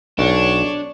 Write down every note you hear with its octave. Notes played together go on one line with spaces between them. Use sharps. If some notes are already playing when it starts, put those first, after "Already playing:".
B1 D4 C#5 C#6